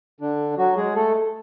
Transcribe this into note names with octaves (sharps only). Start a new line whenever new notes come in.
D3 D4
F#3 F#4
G#3 G#4
A3 A4